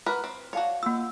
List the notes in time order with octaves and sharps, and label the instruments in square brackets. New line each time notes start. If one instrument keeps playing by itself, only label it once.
[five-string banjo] F#4 A#4 B4
C4
[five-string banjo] F#4 C#5 [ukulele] D5 F5 A5
[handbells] A#3 E6 [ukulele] F4 F#5